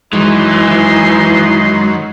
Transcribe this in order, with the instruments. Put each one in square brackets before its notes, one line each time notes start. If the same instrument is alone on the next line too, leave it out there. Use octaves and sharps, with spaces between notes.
[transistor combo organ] F#2 D#3 F#3 [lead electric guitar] E3 [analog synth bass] G#3 [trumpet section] B3 D#4 C6